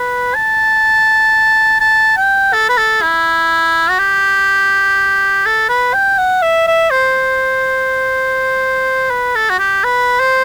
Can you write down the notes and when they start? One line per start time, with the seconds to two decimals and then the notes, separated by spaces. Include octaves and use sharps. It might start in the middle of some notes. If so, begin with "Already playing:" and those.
Already playing: B4
0.35 A5
1.81 A5
2.17 G5
2.53 A4
2.69 B4
2.77 A4
3.02 E4
3.90 F#4
3.99 G4
5.46 A4
5.69 B4
5.94 G5
6.18 F#5
6.42 E5
6.68 E5
6.91 C5
9.10 B4
9.35 A4
9.50 F#4
9.59 G4
9.84 B4
10.20 C5